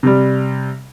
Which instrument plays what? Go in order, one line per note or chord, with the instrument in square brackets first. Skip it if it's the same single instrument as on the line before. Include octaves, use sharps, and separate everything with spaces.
[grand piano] C3 G3